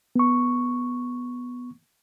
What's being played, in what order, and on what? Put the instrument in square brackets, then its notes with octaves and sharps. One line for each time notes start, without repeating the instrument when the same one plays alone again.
[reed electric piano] B3 C#6